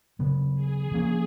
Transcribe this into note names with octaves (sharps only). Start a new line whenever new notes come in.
C#3 F#3 B3
G#4
F3 A#3 C#4